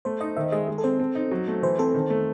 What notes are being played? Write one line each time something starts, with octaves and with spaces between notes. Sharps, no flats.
A3 C5
D#4 D#5
D#3 E5
G#3 D#5
G#3
A4
C4 C5
C4
D#4
F#3
A3
E3 C5
C4 A4
D#3
A3